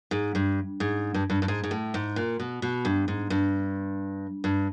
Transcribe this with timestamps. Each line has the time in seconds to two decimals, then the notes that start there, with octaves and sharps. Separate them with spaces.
0.11 G#2
0.35 G2
0.80 G#2
1.14 G2
1.30 G2
1.42 G2
1.48 G#2
1.64 G#2
1.71 A2
1.94 G#2
2.16 A#2
2.39 B2
2.62 B2
2.85 G2
3.08 G#2
3.30 G2
4.44 G2